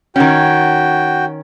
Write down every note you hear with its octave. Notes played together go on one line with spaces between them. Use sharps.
D#3 C#4 F#4 G5